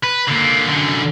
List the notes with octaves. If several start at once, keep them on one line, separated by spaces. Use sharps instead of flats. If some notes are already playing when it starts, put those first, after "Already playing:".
B4
D3 A#3
F#2 D3